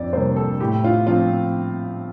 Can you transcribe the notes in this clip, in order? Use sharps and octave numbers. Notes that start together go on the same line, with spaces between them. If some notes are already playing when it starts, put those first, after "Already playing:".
Already playing: F2 D5
C3 G3 A#3 C5
A4
A2 G4
F4
F3 C4 F4